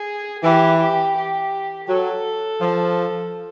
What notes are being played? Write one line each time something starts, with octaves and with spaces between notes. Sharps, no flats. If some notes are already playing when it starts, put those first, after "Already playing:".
Already playing: G#4
E3 G4
G4
G4
F#3 A4
F3